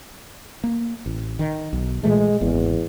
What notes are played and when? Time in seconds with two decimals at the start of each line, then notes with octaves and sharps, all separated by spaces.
0.64 A#3
1.06 A1
1.39 D#3
1.73 B1
2.04 A#2 E3 G#3 A3
2.41 G#1 E2 B3